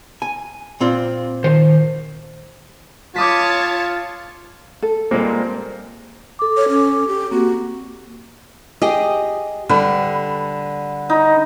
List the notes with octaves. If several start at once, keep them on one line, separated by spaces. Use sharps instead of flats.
G#5
A#2 C4 F4
D#3 C5
F4 C#5 A5 D6 D#6 B6
A4
A#2 G3 G#3 A#3 C4
A4 D6
C#5
C#4
G4
A#3 C4 F#4
G4 G#4 D#5
D3 G3 B4
D#4